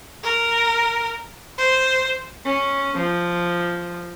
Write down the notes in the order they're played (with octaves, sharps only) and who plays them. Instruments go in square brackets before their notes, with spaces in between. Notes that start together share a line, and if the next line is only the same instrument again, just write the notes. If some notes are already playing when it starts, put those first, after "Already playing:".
[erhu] A#4
C5
[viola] C#4
F3